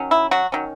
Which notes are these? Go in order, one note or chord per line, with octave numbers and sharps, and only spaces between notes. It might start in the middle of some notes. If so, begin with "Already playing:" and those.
Already playing: D#3 F#3 C#4
E4
F#3 F#4
D#3 F#3 C#4